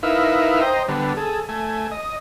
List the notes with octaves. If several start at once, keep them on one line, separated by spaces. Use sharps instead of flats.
D#4 E4 A#4 B4 E5 F5
C5 D#5 G5 A#5
D3 G3 B3
G#4 A4
A3 G#5
D#5